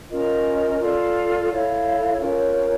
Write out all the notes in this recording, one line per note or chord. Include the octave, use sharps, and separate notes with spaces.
C#4 F4 A#4 D#5
F4 A4 D5
E4 A4 C#5 F5
C#4 F4 A#4 C#5